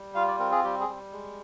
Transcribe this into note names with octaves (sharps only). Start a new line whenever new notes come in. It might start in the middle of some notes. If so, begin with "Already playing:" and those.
Already playing: G3
F4 F5
D5
C4 A#4
G#4
G3 G4
G#4
G3
G#3